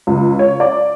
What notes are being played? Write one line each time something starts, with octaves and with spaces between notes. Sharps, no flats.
C#2
C#5
D5